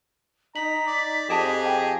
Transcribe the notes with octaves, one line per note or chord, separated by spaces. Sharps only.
D#4 A#5 B6 F#7
D5
F2 G4 G#4 D#5 A5 D7 E7
G5 G#5